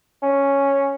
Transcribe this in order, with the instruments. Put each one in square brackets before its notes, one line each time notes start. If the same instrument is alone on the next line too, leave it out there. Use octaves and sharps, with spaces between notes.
[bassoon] C#4